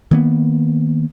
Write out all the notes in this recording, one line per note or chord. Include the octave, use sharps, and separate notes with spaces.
D#3 A#3 B3